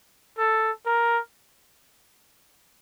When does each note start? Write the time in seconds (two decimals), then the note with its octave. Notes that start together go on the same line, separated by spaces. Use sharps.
0.38 A4
0.86 A#4